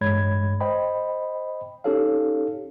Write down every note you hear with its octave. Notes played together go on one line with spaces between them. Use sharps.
A1 G2 G#3 C#5 B5 G#6
C5 D#5 G5 B5
C#4 D#4 G4 A4 C#5 F5